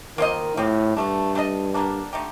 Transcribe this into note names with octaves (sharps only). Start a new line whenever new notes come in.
D#3 A#3 F4 C5 D#5
A2 F3 C4 G4
G2 D3 A3 D4
A3 D4 A4 D#5
D3 G3 A#3 D4
D3 A3 D#4 G4